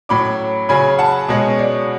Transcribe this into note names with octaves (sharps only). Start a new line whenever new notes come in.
A2 F#3 C#4 B5 D6
C#3 F#3 C#4 G#5 B5
F#5 A5
B2 G#3 C#4
D5